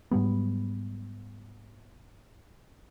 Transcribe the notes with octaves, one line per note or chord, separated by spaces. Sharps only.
G#2 F#3 G3 B3